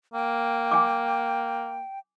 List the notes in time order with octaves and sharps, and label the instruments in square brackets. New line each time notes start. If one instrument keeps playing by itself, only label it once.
[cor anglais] A#3 [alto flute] G5
[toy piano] G#5 D6